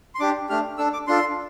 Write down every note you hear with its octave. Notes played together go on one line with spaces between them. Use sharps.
C6
D4 G4 D6
A3 D4 G4 F6
D4 A4 E6
D6
D4 F4 A4 C6